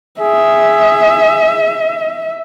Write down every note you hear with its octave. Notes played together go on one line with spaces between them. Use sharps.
G#4 E5